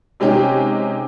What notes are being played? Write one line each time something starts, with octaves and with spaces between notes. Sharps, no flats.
C3 G#3 C#4 D#4 G4 G#4